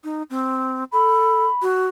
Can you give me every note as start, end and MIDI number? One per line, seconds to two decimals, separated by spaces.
0.04 0.23 63
0.30 0.84 60
0.93 1.45 69
0.93 1.63 83
1.62 1.87 66